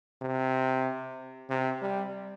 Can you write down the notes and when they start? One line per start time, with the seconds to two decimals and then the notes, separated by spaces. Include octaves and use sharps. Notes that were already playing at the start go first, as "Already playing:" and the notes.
0.22 C3
1.49 C3
1.82 G3